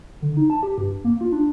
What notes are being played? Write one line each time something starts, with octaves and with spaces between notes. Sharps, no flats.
D3
D#4
A5
G4
G2
A#3
F4
D4